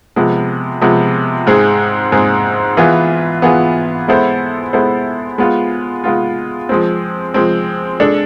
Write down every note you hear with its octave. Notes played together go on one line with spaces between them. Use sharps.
C3 F3 G#3 B3
C3 F3 G#3 B3
G#2 G#3 C4 G#4
G#2 G#3 C4 G#4
E3 B3 F4 G#4 B4
E3 B3 F4 G#4 B4
G#3 B3 E4 A4 C5
G#3 B3 E4 A4 C5
G#3 B3 F4
G#3 B3 F4
F3 G#3 C4
F3 G#3 C4
G#3 D4 A4